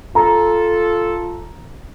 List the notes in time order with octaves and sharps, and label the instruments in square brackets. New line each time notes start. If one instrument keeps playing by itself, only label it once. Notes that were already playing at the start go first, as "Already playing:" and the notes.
[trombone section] F4 A4 [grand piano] A#5